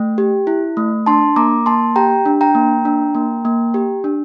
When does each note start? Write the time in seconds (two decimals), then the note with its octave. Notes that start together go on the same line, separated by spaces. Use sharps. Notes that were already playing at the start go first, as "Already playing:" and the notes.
Already playing: A3 G5
0.18 G4
0.47 E4
0.77 A3
1.06 D4 A5 C6
1.36 A#3 A#5 D6
1.66 A#3 A5 C6
1.96 G4 G5 A#5
2.26 D4
2.41 G5 A#5
2.55 A#3
2.85 D4
3.15 A#3
3.45 A#3
3.74 G4
4.04 D4